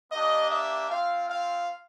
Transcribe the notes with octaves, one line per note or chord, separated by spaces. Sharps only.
A#3 D4 G4 D#5
E5
C4 F4 F5
F5